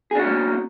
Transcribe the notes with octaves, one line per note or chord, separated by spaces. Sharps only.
A#3 C#4 D4 F#4 G#4